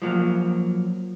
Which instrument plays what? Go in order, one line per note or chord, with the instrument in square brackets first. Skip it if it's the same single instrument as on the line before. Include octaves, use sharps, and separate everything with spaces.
[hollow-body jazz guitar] F3 F#3 A#3